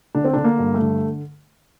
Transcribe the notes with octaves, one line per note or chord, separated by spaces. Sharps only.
D3 D4
C4
D3 D4
A#3
G2
A3
D3